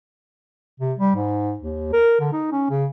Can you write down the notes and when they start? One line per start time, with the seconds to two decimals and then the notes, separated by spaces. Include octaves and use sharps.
0.80 C3
0.98 G3
1.15 G#2
1.59 D#2
1.93 A#4
2.20 D3
2.32 D#4
2.52 C#4
2.70 C#3